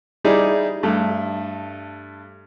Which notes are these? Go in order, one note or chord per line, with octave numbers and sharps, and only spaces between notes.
G3 D#4 E4 G#4 D5
G2 A3